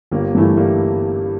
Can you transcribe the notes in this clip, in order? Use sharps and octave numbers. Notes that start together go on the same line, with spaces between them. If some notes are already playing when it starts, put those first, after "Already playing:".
G1 G3 A#3
G2 E3 A3 E4
G3 A#3